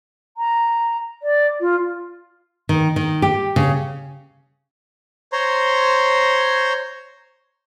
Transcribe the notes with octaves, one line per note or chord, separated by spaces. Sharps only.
A#5
D5
F4
D#3
D#3
G4
C#3
C5 C#5 A#5 C6